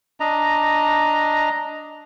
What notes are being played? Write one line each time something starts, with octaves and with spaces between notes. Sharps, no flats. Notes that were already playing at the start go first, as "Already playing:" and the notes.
D4 D#5 A#5